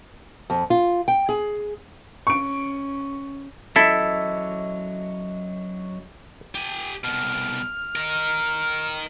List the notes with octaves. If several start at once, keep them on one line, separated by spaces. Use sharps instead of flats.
F2
F4
G5
G#4
C#4 C#6 D7
F#3 C#4 E4 A4 D#5 E5
G4 G#5
C2 B2 F6
D#4 A#4